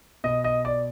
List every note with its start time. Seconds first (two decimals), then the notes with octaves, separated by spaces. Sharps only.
0.24 B2 D#5
0.44 D#5
0.65 D5